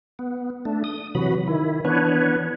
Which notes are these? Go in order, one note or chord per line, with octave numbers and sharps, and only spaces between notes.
B3
A3 D4
D#6
C3 E3 F#3 F#4 B5
D#3 E4
E3 B3 D4 B4 C#5